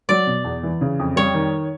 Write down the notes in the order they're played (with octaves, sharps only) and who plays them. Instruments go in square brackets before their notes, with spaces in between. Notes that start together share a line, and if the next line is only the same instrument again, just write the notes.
[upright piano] F#3 [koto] D5
[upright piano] B2
E2
E3
C#3
F2
[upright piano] G3 [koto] C#5
[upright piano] D#3